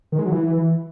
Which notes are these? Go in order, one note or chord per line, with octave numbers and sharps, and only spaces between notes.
D#3
G#3
F#3
E3